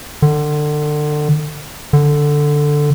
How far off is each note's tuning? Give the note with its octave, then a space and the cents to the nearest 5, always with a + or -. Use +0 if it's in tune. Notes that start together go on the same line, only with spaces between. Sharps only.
D3 +30
D3 +5